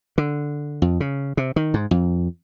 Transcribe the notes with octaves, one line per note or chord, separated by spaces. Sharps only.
D3
F2
C#3
C3
D#3
G#2
F2